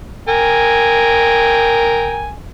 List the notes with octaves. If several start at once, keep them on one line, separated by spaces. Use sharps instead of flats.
A#4 G5 G#5